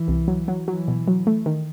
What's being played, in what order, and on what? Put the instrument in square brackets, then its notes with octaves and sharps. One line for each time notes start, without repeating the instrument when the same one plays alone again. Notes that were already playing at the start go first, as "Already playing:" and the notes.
Already playing: [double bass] E3
[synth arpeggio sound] C2
F#3
F#3
[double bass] E3 [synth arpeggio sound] F#3
[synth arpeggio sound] B2
F#3
A3
D#3